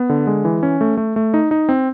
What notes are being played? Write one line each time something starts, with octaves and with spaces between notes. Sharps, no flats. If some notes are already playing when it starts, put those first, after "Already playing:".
Already playing: B3
D3
G#3
E3
C#4
A3
A3
A3
D#4
D#4
C4